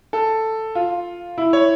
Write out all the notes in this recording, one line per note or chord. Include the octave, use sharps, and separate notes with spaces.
A4
F4
E4
C#5